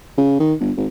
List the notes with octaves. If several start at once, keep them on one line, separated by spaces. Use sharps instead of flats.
C#3
D#3
G1
G#1